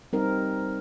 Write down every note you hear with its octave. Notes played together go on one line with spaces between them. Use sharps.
G3 C4 D#4 A#4